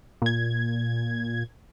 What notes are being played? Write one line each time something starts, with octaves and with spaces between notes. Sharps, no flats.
A#2 G#6